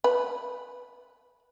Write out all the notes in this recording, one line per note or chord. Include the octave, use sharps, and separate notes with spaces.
B4